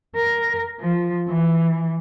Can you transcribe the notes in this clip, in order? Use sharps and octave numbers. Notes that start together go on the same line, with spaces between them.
A#4
F3
E3